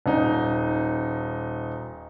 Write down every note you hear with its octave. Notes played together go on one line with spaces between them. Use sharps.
D#1 D#4